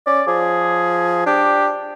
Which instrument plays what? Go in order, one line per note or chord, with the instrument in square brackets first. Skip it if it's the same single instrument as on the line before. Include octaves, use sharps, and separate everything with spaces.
[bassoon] C#4 [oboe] D5
[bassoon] F3 [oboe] G#4
[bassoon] D4 [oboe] G4